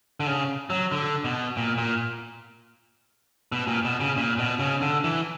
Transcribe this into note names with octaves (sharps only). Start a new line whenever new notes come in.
D3
C#3
F#3
D3
B2
A#2
A#2
B2
A#2
B2
C#3
A#2
B2
C#3
D3
E3